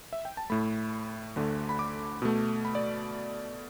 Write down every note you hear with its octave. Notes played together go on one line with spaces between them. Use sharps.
E5
G5
A5
A2 A3 B5
D2 D3 A3
B5
D6
B2 A3
B5
D5